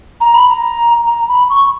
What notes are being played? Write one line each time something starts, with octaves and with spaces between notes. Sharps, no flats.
A#5
B5
A#5
A#5
B5
C#6